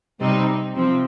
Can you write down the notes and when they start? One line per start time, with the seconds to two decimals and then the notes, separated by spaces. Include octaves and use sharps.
0.20 C3 G3 C4 D#4
0.74 C3 F3 C4